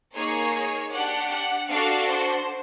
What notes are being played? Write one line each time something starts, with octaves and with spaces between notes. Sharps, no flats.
A#3 D#4 G#4 C#5
D4 G4 F#5
F#5
D4 F#4 A4 F5
C5